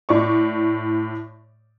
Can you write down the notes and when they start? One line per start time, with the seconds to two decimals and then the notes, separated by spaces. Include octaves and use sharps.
0.09 A2 D5 C#6